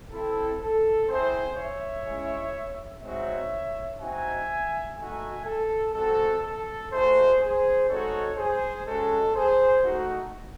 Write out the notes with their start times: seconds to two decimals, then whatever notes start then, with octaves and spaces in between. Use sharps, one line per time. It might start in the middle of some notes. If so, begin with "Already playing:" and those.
0.11 C4 E4 A4
0.60 A4
1.08 C4 E4 G#4 C5
1.56 C#5 E5
2.05 G#3 C#4 E4
3.02 G#3 C4 D#4 F#4 C#5 E5
3.99 C4 D#4 F#4 E5 G#5
4.96 A3 D#4 F#4 E5 G#5
5.45 A4
5.93 G#3 C4 F#4 A4
6.42 A4
6.91 A3 D#4 F#4 G#4 C5
7.39 G#4 C5
7.88 G#3 C4 D#4 F#4 A4 C#5
8.36 G#4 C5
8.85 G#3 C#4 F#4 A4
9.34 G#4 C5
9.82 A3 D#4 F#4